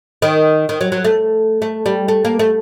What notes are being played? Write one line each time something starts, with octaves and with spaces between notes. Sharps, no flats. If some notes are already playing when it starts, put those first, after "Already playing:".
D#3
D#3
F#3
F#3
A3
A3
G3
A3
A#3
A3